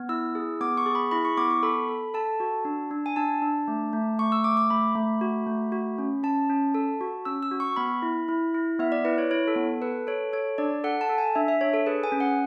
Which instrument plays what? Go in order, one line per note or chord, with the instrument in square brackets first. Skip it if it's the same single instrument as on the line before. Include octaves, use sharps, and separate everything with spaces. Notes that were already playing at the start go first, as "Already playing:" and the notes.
Already playing: [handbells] B3
E4 E6
G#4
B3 D6
C#6
G#4
B5
E4 B5
C#6
B3 D6
C#6
A4 B5
A4
A4 A5
F#4
D4
D4
G#5
D4 A5
D4
A3
A3
A3 C#6
E6
A3 D6
D6
A3 B5
A3
F#4
A3
F#4
C#4
C#4 A5
C#4
A4
F#4
C#4 E6
E6
F#4
C#6
B3 B5
E4
E4
E4
B3 E5
D5
E4 B4
C#5
E4 C#5
A4
B3
A4 B4
A4 C#5
A4 C#5
D4 D5
A4 F#5
A5
A4
G#5
D4 E5
E5
D4 C#5
A4
G#4 B4
G#5
C#4
F#5